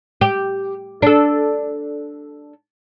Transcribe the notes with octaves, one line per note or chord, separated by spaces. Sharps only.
G4
D4 A4